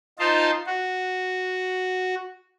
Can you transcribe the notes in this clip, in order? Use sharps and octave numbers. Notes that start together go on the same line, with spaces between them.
D#4 F4 C5 A5
F#4